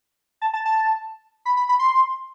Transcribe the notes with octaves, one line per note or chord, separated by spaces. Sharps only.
A5
A5
A5
B5
B5
B5
C6